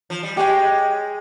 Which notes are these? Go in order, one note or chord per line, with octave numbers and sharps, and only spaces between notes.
F3
G3
G#3 G4 C#5 G5